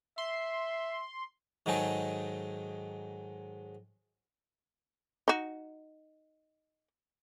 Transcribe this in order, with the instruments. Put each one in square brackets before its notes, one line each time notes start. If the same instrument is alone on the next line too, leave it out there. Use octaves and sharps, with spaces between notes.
[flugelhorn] E5 [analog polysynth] C6
[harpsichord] G#2 D#3 F#3 D#4 G#4 A4
[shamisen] D#4 F#4